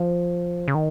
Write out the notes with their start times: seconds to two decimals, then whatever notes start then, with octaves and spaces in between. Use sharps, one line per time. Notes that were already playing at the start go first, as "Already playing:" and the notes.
Already playing: F3
0.68 C#3
0.75 D#3